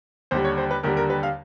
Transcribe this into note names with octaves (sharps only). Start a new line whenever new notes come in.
D#2 D3 G3 C5
C#5
C5
B4
D#2 D3 G3 A#4
A#4
B4
F5